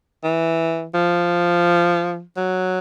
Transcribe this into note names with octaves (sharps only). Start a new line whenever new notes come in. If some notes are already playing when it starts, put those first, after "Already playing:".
E3
F3
F#3